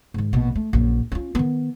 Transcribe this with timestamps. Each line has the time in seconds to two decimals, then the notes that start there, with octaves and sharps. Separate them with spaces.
0.14 G#2 D#3
0.33 A#1 B2
0.55 A3
0.73 A#1 F#2
1.12 C#4 F4
1.35 D#3 B3